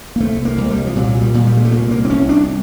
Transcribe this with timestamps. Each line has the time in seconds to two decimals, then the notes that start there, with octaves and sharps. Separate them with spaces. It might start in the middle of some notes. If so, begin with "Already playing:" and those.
0.16 A#3
0.20 C2 A3
0.45 A#3
0.58 C2
0.70 G3
0.87 F3
0.96 A#2 F#3
1.22 G3
1.34 A#2
1.47 G3
1.57 G#3
1.64 A3
1.71 C2 A#3
1.91 A#3
2.05 C4
2.10 C2 C#4
2.29 D4